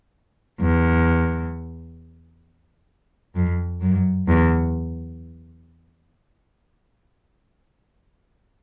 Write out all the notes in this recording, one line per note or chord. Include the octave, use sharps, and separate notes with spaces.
E2
F2
F#2
E2